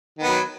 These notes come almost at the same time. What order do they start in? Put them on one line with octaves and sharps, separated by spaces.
D#3 B3 F#3